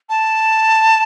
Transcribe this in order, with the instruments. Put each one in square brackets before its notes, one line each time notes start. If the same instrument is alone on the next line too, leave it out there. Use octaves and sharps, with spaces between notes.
[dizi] A5